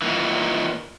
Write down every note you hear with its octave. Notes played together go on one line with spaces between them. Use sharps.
A#2 D#3 E3